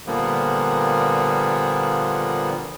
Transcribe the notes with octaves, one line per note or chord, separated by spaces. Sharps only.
A#2 D3 F3 G3 A#3 B3